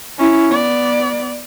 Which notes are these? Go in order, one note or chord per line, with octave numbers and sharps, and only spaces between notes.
C#4 E4
B3 D5